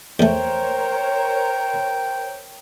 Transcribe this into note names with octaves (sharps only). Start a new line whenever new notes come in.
E2 A3 A#4 C5 C#5 G5